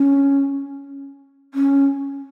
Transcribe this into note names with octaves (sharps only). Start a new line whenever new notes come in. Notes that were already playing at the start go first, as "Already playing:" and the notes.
Already playing: C#4
C#4